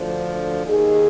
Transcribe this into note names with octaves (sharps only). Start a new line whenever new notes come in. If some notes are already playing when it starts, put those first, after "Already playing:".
Already playing: D2 D3 F3
D#2 D#3 G#4